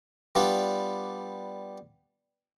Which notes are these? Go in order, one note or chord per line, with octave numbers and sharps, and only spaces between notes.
G3 B3 D4 F4 B4